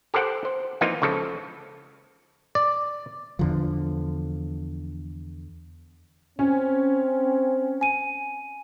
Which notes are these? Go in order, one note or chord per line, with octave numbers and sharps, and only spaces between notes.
G4 A4 A#4 C5 F#5 G5
C5
E3 F3 A#3 C4 D#4 F4
C#2 C#3 F3 A4
D5
E2 D3 F3
C4 C#4
G#5 D#7